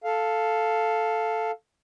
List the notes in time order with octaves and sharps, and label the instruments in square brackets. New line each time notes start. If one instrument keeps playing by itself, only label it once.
[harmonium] A4 F5